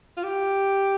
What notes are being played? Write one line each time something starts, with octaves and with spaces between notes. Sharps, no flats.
F4
G4